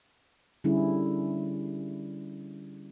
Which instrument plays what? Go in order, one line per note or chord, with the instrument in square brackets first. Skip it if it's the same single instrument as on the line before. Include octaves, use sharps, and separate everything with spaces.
[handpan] D3 G3 C#4 E4 G#4